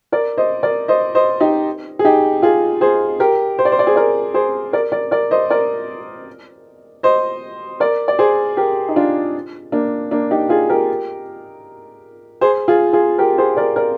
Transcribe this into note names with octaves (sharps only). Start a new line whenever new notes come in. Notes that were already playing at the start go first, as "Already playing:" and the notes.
A#4 D5
C5 D#5
A#4 D5
C5 D#5
C5 D#5
D#4 G4
G#4
D#4 G4
F4 G#4
G#4 C5
G4 A#4
C5
D5
C5
D5
G#4 C5
A#4 D5
G#4 C5
A#4 D5
A#4 D5
A#4 D5
C5 D#5
A#4 D5
C5 D#5
A#4 D5
D5
G#4 C5
G4 A#4
D#4
D4 F4
A#3 D4
A#3 D4
D#4 G4
F4 G#4
G4 A#4
G#4 C5
F4 G#4
F4 G#4
G4 A#4
G#4 C5
A#4 D5
A#4 D5